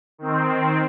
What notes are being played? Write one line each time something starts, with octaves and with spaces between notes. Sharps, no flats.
D#3 C4